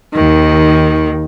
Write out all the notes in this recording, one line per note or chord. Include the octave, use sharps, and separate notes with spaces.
D#2 D#3